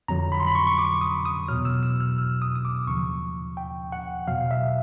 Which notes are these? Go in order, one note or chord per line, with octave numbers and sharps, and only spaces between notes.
F2 D3 F#3 A#5
B5
C6
B5
C#6
C#6
D6
D#6
D#6
E2 B2 F#3 F6
E6
E6
F6
E6
D#6
D#6
D6
D#2 C#3 F3 C#6
G5
F#5
E2 B2 F#3 F5
E5